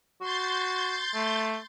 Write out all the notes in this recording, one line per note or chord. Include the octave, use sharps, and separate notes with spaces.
F#4 C6 G6 A6
A3